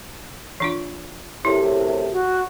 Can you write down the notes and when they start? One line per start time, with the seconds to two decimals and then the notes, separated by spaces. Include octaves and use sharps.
0.60 E3 D4 F4
1.45 F#2 A2 C3 E4
2.12 F#4